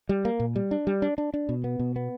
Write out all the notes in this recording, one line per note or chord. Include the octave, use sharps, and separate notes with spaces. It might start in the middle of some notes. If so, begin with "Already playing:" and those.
G3
A#3
A#2
G3
D4
G3
D4
D4
D4
B2
B3
B2
B3